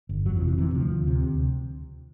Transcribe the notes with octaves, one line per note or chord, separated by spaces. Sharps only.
G1
F2 F#3
F3
C3
E3
C3 E3
D2 F3
D2
C3
D2